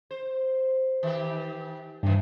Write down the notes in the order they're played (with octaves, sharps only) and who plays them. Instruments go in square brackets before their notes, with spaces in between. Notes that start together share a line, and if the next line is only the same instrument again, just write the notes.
[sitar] C5
D#3 G4
[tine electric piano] G2 [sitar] C3 D#3